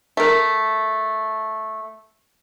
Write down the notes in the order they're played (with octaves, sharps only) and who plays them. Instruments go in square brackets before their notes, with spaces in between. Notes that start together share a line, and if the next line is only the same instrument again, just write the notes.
[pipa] A3 A#4